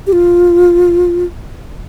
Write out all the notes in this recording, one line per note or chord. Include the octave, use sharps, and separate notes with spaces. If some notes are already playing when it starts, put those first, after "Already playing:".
G4
F4